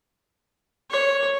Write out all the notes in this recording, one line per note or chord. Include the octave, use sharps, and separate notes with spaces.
C#5